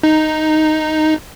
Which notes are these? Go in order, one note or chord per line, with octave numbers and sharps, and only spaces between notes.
D#4